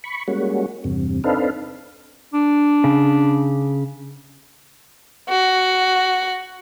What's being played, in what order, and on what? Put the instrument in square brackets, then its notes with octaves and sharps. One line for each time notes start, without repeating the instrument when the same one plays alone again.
[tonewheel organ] B5 C#6
G3 G#3 A#3 C#4 F#4
E2 G2 C3
C4 D4 D#4 A4 B4 F5
[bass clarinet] D4
[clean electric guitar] C#3
[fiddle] F#4